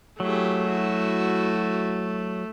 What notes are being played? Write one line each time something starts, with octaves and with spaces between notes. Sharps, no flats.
F#3 A3 E4 G4 G#4
E4 F#4